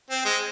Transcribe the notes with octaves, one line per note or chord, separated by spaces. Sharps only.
C4
G#3